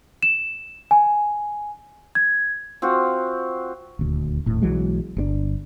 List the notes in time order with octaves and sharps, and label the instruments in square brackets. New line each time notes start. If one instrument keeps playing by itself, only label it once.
[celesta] E7
G#5
G#6
[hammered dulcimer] C4 F4 F#4
[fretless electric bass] D#1 D2
D#1 A2
B1 E3 F#3 G#3
G1 B2 D4